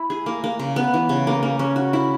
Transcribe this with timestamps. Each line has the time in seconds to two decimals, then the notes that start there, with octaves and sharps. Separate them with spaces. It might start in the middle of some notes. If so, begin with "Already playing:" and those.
Already playing: E4
0.10 G#4
0.26 A#3
0.44 A#3
0.59 C#3
0.76 B3
0.94 E3
1.09 C#3
1.27 A#3
1.43 A#3
1.59 C#4
1.76 F#4
1.93 E4